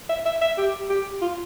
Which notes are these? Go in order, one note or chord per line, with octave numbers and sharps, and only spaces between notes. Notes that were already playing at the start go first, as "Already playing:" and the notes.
E5
E5
E5
G4
G4
F4